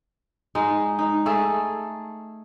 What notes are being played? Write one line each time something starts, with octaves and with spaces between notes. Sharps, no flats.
G#3 D#4
D#4
A3 G#4 A4